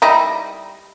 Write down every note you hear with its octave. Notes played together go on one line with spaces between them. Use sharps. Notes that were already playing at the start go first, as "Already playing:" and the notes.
G3 D#4 E4